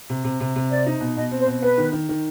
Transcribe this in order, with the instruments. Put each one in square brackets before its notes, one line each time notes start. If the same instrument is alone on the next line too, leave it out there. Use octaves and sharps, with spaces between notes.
[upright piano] C3
C3
C3
C3
[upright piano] C4 [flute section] D5
[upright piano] D#4
B2
[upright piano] B2 [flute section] D#5
[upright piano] C4
[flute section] C5
[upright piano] B2
[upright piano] B3 [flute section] B4
[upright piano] D#3
D#3
D#3